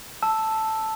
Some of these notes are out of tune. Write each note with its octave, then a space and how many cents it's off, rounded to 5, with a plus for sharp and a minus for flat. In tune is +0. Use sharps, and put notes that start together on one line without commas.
A5 +0 E6 +0